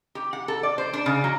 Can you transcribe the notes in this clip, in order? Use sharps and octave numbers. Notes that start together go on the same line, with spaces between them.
G4
F#5
A4
D5
C5
D4
C#3
F#3